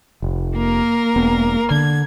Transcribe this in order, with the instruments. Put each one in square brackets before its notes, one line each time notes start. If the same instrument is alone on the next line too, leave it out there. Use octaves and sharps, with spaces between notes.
[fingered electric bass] F1
[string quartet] A#3 A#4
[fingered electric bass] E1 B3
[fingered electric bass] D3 [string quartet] G#6